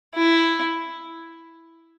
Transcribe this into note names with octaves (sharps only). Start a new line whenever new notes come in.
E4